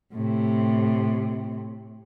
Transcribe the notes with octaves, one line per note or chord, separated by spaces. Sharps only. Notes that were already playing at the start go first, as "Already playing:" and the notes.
A2 C3